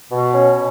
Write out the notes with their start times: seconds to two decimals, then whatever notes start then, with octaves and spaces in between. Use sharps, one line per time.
0.12 B2
0.34 C#4